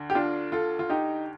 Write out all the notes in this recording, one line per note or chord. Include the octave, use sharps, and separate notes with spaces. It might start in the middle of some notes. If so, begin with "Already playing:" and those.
Already playing: D2
G4
D4 F4
F4 A4
F4
D#4 G4